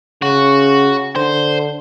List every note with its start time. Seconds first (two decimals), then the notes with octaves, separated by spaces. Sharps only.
0.22 C#3 F#4
1.16 D3 C5